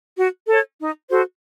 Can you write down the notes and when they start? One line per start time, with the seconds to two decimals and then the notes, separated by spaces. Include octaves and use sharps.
0.17 F#4
0.47 A4 C#5
0.80 D#4
1.10 F#4 A4 C5